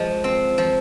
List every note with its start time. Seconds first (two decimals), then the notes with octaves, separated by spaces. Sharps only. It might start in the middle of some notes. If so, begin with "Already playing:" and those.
Already playing: F3 G#3
0.24 C4
0.58 F3